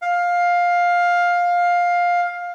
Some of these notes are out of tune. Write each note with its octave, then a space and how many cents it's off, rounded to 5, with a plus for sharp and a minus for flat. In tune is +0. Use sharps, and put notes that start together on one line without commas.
F5 +15